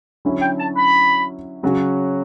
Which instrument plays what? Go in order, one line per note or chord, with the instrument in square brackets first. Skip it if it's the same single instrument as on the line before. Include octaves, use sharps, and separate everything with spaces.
[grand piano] D3 F#3 C#4 E4
[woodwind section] G5
A5
B5
[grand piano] C#3 F#3 C#4 F#4